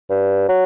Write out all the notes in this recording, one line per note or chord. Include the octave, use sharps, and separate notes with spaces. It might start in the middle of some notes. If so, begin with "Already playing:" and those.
G2
F#3